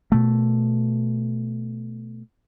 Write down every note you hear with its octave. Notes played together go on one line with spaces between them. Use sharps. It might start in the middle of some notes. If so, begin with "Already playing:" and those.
B2 A3